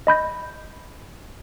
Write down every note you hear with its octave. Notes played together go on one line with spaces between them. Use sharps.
D#5 B5 G6 A#6